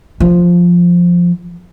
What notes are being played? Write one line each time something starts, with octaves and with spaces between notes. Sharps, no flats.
F3